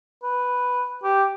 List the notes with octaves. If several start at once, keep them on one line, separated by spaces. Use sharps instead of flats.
B4
G4